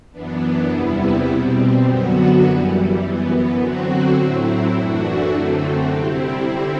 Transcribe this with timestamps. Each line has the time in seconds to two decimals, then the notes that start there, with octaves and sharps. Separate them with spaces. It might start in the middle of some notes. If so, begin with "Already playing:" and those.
0.11 F#2 E3 B3 D4
0.69 E2 C3 G3 B3 E4
1.26 B2 G3 C4
1.84 F#2 D3 F#3 B3 F#4
2.42 F#2 E3 G3
2.99 F#2 E3 B3
3.57 D3 F#3 C4 F#4
4.15 A2 F#3 C4 E4
4.73 F#2 E3 A3 D4 F#4
5.30 F#2 D3 F#3 A3 C4
5.89 C3 G3 C4 E4
6.46 D3 G3 C4 E4